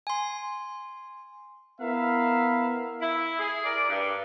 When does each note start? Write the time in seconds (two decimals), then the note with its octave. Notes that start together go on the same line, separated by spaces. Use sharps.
0.07 G#5 C6
1.81 B3 E4 A#4 E5 F5 B5
3.01 E4
3.39 G#4
3.65 A#4 D5
3.89 G2